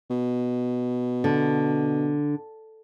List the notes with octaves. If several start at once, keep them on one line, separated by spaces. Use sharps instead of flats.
B2
D3